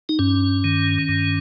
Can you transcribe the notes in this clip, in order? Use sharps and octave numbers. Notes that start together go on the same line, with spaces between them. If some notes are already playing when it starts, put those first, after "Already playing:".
D#4
G2 C#4
D#3
G2